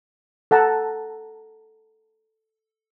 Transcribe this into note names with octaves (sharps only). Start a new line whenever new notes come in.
A4 F#5 A5 A#5